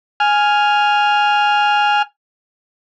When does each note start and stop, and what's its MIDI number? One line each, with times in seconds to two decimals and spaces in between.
0.20 2.02 80
0.20 2.02 89